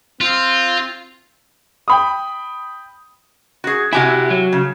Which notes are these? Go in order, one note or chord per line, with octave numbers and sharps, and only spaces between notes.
C4 F4
G5 B5 D#6
F#4 G#4
C3 E4 F#4 G4 G#5
F#3
C#3